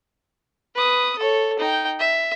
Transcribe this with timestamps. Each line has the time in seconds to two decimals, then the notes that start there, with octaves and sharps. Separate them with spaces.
0.75 B4 D#6
1.18 A4 C#5
1.59 D#4 G5
2.00 E5